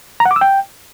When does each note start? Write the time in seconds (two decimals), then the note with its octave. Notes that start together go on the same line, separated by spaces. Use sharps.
0.20 A#5
0.25 F#5
0.31 D6
0.36 E6
0.41 G5